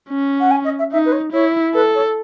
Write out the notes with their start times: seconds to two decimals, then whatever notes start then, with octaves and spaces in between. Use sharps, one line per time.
0.09 C#4
0.40 F#5
0.51 G#5
0.64 D#5
0.79 E5
0.92 D#4 E5
1.06 B4
1.12 C#5
1.32 E4 C#5
1.74 A4 B4
1.95 C#5